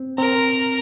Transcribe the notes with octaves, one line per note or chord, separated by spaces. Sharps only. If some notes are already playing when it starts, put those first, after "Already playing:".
Already playing: C4
C4 A#4